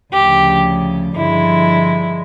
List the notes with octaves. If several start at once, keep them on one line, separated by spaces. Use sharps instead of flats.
D2 C#3 F3 G4
G2 D3 F3 G#3 E4